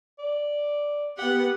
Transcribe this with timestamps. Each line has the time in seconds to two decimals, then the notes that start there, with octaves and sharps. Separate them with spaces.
0.19 D5
1.18 B3 G4 F#5